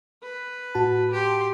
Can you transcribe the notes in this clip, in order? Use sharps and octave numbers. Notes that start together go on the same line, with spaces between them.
B4
A2 F#4 A5
G4 C6